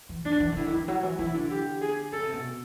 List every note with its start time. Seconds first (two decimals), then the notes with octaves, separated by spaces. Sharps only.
0.09 E3
0.25 E3 D4
0.40 E3
0.52 D#3
0.55 D3 E4
0.66 D#3
0.77 E3
0.88 F#3
1.03 E3
1.19 E3 E4
1.34 D3
1.50 G4
1.81 G#4
2.13 C#3 A4
2.23 C3
2.33 B2